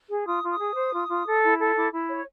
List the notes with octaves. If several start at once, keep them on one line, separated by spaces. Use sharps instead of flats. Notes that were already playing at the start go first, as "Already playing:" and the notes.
G#4
F4 D#6
F4
D#6
G#4
C5
F4
F4
A4
E4
A4
E4 D6
E4
C#5